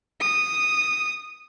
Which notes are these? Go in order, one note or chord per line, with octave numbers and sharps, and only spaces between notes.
D#6